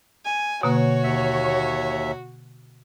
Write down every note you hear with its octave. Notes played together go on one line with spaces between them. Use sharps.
G#5
B2 D3 A#3 F#4 C#5
D#2 E5